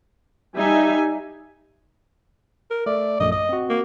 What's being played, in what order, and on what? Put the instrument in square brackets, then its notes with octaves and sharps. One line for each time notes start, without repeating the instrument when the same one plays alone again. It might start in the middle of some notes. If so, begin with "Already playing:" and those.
[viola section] G3 D#4 E5 G#5
[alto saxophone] A#4
[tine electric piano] A3 [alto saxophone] D5
[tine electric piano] A#1 F#2 A3 [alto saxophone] D#5
[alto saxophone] D#5 [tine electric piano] D#6
[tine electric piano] C4 F#4
[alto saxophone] A#3